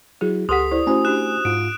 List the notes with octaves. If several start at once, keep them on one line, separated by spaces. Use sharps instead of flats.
F#3 E4 F#4 G#4
C#2 G4 A4 F#5 C6 D#6 B6
E4 C5 D5
A3 C#4 E4 F#4 C5 G#5
D4 G4 F#6 E7
G#2 F4 D7